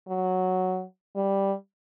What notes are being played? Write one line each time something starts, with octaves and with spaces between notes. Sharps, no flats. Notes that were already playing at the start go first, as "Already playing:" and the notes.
F#3
G3